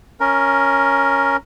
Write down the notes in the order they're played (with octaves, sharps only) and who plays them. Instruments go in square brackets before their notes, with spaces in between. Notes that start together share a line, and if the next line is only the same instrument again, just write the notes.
[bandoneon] C#4 A#4